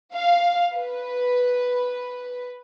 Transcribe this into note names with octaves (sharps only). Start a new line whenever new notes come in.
F5
B4